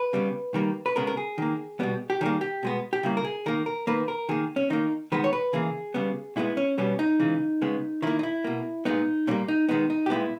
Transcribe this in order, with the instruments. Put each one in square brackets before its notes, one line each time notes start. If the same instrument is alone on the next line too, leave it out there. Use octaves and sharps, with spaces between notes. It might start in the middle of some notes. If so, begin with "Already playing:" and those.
Already playing: [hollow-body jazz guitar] B4
C#3 G3 B3
D#3 G3 A#3
B4
C#3 G#3 B3 A#4
A#4
G#4
D#3 A#3
B2 G3 B3
G4
D#3 G3 A#3 G#4
G4
B2 G#3 B3
G4
C#3 G3 A#3 E4
A#4
G#4
D#3 A#3 A#4
A#4
D#3 A#3 B4
A#4
D#3 A#3 G#4
C#4
D#3 A#3 D#4
D#3 G#3 B3 B4
C#5
B4
C#3 E3 A#3 G#4
C#3 G3 B3
A#2 G#3 B3 E4
C#4
B2 G3 B3 C#4
D#4
C#3 E3 G#3
C#3 G#3 B3
D#3 A#3 E4
D#4
E4
B2 A#3
A#2 G#3 B3 D#4
A#2 G3 A#3 C#4
D#4
D#3 G#3 B3 D#4
D#4
G4
A#2 G#3 B3 E4